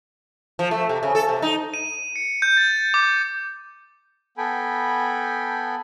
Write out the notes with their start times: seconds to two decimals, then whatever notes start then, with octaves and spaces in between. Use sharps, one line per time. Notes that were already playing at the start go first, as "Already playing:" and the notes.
0.59 F3
0.71 A3
0.89 C3
1.03 C#3
1.15 A4
1.29 C3
1.42 D#4
1.74 D#7
2.16 C#7
2.42 G6
2.57 A6
2.94 D6
4.38 B3 A4 G5 G#5 B5